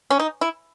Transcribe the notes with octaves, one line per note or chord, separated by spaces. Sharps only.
C#4
D#4
E4